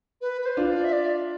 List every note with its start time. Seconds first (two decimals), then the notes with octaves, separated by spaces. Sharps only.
0.21 B4
0.41 B4
0.46 C5
0.57 D4 F4
0.70 D5
0.84 E5
0.93 D5